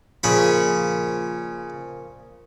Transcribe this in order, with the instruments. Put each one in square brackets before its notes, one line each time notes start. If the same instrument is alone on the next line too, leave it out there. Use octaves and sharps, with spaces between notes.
[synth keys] A#2 F3 [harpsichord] C#3 C#5 B5